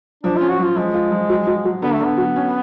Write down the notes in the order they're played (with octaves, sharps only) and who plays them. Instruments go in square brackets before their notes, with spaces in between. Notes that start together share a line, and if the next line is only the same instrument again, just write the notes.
[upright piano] F3 [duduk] D4
[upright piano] C#4 [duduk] F4
[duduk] F#4
[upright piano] F3 [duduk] F4
[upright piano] F3 [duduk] G#3
[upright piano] F4
F3
F#3
F#3
F#3
[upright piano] D3 [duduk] B3
[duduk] A3
[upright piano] D3 [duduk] B3
[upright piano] F#3
C#4